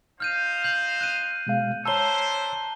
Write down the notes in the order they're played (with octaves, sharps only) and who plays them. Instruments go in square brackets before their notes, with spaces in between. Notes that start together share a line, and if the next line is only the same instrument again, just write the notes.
[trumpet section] D#4 C5 F5 [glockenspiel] F6 G6 D#7
[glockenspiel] G6 F#7
F#6 D#7
[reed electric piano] B2 G#3 F5
[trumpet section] D4 E4 C5 [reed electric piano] C#5 E6 [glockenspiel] A5 A#5 G7